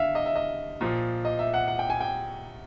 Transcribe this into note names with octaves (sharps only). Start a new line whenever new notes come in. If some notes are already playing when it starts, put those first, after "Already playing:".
Already playing: D3 E5 F5
D#5
E5
D#5
A#2 F3
D#5
E5
F#5
F#5
G5
G#5
G5